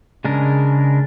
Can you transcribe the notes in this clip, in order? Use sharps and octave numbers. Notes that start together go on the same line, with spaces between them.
C#3 G#3 D4 A#4